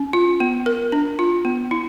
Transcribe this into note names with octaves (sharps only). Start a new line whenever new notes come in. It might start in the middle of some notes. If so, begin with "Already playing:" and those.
Already playing: C#4
F4
B3
A#4
D4
F4
B3
E4